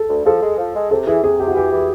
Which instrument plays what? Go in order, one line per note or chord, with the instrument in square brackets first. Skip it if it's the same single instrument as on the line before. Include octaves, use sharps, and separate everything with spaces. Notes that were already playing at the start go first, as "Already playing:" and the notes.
Already playing: [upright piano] A4
[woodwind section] D2
[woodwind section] F3 [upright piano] A4
[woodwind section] G#3
F3
G#3
[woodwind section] C3 [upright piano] A4
[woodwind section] E3 [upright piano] G#4
[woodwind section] C3 [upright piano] G#4
[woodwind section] C3 [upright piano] G4
[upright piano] F#4
[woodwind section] E3 [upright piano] G4
[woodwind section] E3